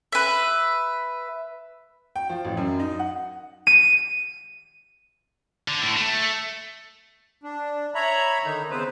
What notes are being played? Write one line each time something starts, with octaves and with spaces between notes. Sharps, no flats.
B4 E5
G5
F3
A1
F#2
D#4
F#5
D#7
D3
A2
A3
D4
C#5 E5 A#5 B5
D3 D#3 D#4
C#3 B3 C4 B4 C5